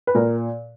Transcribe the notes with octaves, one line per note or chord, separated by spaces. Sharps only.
B4
A#2 A#4